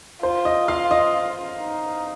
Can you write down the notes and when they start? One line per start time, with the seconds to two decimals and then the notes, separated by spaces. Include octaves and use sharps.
0.23 F4 C5
0.45 D#5
0.68 F5
0.91 D#5
1.58 D#4